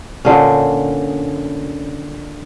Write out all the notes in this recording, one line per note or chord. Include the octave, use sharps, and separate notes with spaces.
A#2 D3 C#4